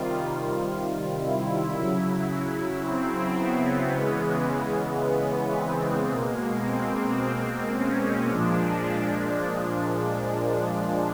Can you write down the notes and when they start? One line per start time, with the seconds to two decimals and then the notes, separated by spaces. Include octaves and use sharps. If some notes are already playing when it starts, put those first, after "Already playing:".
Already playing: C3 D#3 G3 F4
1.19 E4
1.74 C#3 F#3
2.83 C4
3.38 B3
3.92 C#3 E3 G#3
5.01 B3
5.56 C4
6.10 B2 G#3 A#3
6.65 C4
7.75 C#4
8.29 A#2 F3 G#3 D4